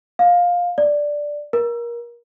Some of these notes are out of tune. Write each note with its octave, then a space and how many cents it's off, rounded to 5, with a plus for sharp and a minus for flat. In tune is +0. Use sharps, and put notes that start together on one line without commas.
F5 +15
D5 +0
A#4 +25